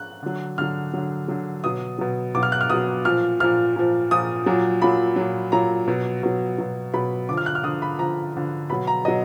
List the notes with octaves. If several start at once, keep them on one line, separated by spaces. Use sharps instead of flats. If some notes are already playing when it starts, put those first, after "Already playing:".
Already playing: F#6
D3 F#3
D3 F#3 F6
D3 F#3
D3 F#3
B2 F#3 D#6
B2 F#3
B2 F#3 D6
F6
F#6
F6
B2 F#3 D#6
A#2 F3 F6
A#2 F3 F6
A#2 F3
A#2 F3 D#6
A#2 F#3
A#2 F#3 B5
A#2 F#3
A#2 F#3 A#5
B2 F#3
B2 F#3
B2 F#3
B2 F#3 B5
D3 F3 D6
F6
F#6
F6
D3 F3 D#6
B5
D3 F3 A#5
D3 F3
B2 F#3 B5
A#5
B2 F#3 D#5